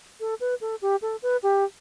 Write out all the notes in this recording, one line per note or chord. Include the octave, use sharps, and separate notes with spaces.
A4
B4
A4
G4
A4
B4
G4